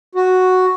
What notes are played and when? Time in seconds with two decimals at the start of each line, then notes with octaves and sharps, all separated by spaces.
0.15 F#4